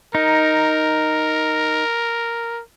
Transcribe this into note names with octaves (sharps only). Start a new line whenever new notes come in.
D#4 A#4